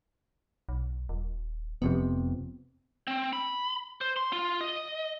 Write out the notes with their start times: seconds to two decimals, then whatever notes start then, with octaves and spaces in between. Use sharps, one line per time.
0.69 B1
1.09 D#1
1.82 F1 F2 C3 B3
3.07 C4
3.33 B5
4.01 C5
4.17 C6
4.33 F4
4.61 D#5